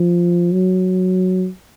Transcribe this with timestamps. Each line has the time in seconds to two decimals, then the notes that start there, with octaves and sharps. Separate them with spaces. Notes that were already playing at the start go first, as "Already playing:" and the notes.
Already playing: F3
0.52 F#3